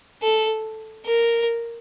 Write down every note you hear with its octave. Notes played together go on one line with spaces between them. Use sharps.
A4
A#4